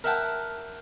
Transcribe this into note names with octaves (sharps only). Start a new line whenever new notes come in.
A#4 E5 F#5 G5 A5